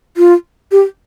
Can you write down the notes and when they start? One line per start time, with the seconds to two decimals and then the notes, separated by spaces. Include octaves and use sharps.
0.17 F4
0.72 G4